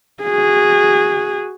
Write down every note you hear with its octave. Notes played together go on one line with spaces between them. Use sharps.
F#4 G#4